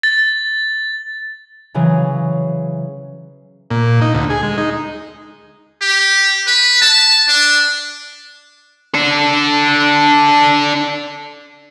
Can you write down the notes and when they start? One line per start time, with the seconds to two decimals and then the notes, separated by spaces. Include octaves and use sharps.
0.03 A6
1.74 C#3 E3 F#3 G#4
3.70 A#2
4.01 D#4
4.14 D2
4.30 G#4
4.43 G#3
4.58 D#4
5.81 G4
6.47 B4
6.82 A5
7.28 D4
8.94 D4 A4